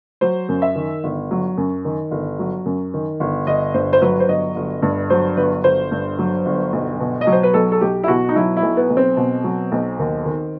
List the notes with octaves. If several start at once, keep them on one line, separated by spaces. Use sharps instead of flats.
F#3 C5
F#2
E5
D#3
G1
F#3
F#2
D#3
G1
F#3
F#2
D#3
G1
G1 D#5
G2 C5
C5
F#3 B4
C5
G1 D#5
G1
G2
F#3 C5
G1 B4
G1 C5
G2
F#3
G1
B1
B2
D#5
F#3
C5
B4
B1 A4
A4
B1 G4
E4
B2 F#4
D#4
F#3 E4
E4
B1
B3
B1
C4
B2
F#3
B1
D#2
D#3